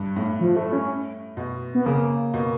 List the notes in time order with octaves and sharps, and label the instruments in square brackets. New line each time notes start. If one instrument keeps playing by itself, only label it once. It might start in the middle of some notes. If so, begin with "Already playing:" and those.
Already playing: [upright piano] G2
A2
[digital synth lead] F3
A3
C#4
[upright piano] B2
[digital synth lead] B3
[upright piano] C#3 [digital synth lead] A#3
[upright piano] B2